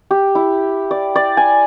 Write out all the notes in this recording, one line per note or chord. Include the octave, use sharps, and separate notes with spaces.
G4
E4
D5
D5
G#5